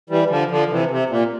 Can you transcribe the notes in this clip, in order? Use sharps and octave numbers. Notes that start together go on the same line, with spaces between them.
E3 G3
D3 F3
D3 F3
C3 E3
C3
A#2